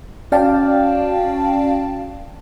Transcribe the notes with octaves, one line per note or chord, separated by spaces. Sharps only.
C#4 F#4 D5 F5 G5 A5